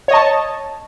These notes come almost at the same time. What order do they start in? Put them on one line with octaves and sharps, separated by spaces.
C#5 D#5 A5